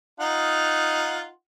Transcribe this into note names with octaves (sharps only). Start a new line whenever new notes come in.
D#4 F4 F#5